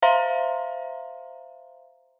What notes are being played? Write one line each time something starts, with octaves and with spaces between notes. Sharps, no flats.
C5 E5 F5 A#5 C6